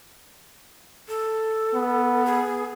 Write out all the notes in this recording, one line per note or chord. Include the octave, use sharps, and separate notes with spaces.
A4
B3
G#4